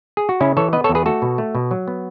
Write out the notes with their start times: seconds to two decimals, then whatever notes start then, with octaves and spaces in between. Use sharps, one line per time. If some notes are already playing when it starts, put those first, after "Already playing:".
0.17 G#4
0.29 F#4
0.40 C#3 C#4 E4
0.57 E3 A4 C#5
0.73 B3 B4 D#5
0.84 A4 C#5
0.89 E2
0.95 G#4 B4
1.06 A3 F#4 A4
1.22 B2
1.38 A3
1.55 B2
1.71 F#3
1.88 B3